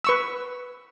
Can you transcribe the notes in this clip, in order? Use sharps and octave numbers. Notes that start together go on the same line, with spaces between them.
B4 C#6 E6